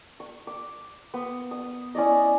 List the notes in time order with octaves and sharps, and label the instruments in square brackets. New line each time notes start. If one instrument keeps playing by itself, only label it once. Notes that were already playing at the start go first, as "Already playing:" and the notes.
[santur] C#6
D6
B3
D#6
C#4 E4 D5 D#5